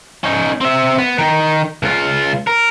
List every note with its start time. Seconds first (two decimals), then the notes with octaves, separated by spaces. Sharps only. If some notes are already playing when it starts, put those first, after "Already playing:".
0.24 C#4 D#4
0.61 C4 E5
0.98 B3
1.19 D#3 D#4
1.83 C#2 F4
2.47 A#4